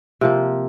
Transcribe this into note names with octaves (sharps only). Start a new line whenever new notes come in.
C3 F3 A#3